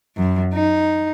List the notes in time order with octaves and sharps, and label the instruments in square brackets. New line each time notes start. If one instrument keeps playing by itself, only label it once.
[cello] F#2
D#4